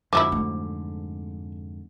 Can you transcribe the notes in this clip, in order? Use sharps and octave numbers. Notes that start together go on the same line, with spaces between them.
F2 G#2 D3 F3 F#3 E4 D6
A3